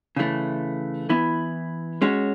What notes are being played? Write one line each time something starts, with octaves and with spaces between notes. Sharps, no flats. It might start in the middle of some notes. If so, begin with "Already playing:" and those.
C#3 E3 A3
E3 B3 E4
G#3 C#4 F#4